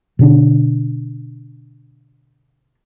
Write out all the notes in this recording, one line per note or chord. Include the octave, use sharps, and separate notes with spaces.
B2 D3 C#4 D4